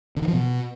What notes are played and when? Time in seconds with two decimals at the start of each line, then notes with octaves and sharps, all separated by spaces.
0.17 D3
0.22 D#3
0.28 F3
0.33 B2